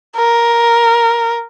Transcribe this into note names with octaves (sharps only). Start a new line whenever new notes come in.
A#4